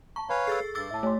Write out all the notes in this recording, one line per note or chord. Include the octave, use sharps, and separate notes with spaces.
A5 A#5 C#6
B4 C#5 F5 G#5 A#5 B5
G#4 A4 E6 A6 C7
G2 D6 E6 A6
A2 E5 A5
A3 C#5 C6